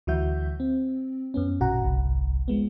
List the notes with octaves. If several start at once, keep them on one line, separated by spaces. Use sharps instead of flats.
D2 E3 F#3 F#4 E5 G6
C4
F#2 B3 C#4
A#1 B2 F#4 F#5 A#5
G1 C2
F3 G#3 B3